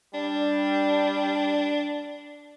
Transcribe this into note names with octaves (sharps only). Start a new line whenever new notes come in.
G3 D4